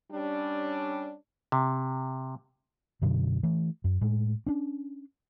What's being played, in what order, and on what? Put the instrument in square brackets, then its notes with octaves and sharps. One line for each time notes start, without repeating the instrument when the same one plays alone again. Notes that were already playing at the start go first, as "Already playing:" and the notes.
[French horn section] G3 C#4 D4
[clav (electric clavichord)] C3
[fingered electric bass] F#2 B2 D3 F#3
E3 A3
F#2
A2 G#3
C#4 D4